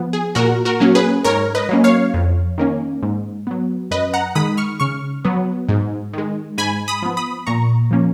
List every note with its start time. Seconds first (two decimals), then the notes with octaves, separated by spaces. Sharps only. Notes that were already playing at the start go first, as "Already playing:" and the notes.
Already playing: F3 B3
0.13 G#4
0.35 A#2 F#4 A#4
0.65 F#4 A#4
0.80 F#3 A#3 C#4
0.95 G#4 B4
1.24 G#2 A#4 C#5
1.55 B4 D#5
1.69 F#3 A#3 C#4
1.84 C#5 F5
2.14 F2
2.58 D#3 A#3 C#4
3.03 G#2
3.47 F#3 B3
3.91 F#2 B4 D#5
4.13 F#5 A#5
4.35 D#3 G#3 B5 D#6
4.57 C#6 F6
4.80 C#3 C#6 F6
5.25 F#3 B3
5.69 G#2
6.13 D#3 G#3
6.58 G#2 G#5 B5
6.88 B5 D#6
7.02 F3 B3
7.17 B5 D#6
7.47 A#2 A#5 C#6
7.91 F3 A#3 C#4